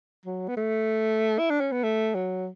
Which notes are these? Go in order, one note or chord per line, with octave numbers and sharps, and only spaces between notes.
F#3
B3
A3
E4
D4
C#4
B3
A3
F#3